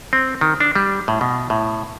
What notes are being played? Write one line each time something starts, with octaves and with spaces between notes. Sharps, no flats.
C4
D#3
D4
G3
A2
B2
A2